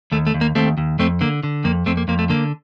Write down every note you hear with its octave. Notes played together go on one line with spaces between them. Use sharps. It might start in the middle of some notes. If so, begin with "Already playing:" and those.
D#2 A3
A3
D#2
A#3
D#2 A3 C4
D#2
F2 A3 C4
D3 A#3
D3
F2 A#3
F2 A3 C4
A#3
F2 A#3
A3
D3 A#3